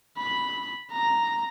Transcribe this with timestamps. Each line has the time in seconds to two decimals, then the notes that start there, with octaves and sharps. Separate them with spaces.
0.17 B5
0.92 A#5